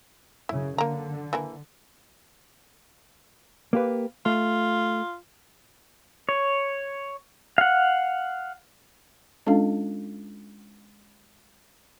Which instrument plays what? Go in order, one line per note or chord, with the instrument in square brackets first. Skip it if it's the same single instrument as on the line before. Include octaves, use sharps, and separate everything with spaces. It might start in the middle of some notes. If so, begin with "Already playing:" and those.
[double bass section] F#2 C#3 [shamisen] E4
[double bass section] D3 [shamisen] A#3 A#5
[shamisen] E3 A#3 E4
[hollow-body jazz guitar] A#3 G4 B4
[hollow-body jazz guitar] A3 [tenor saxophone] F4
[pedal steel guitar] C#5
F5 F#5
[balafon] G#3 C#4 D4 F4 A4 F5